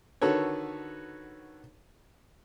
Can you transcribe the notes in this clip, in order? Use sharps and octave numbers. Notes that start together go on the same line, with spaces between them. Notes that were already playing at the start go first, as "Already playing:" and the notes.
D3 D#3 F#4 A4 B4 C#5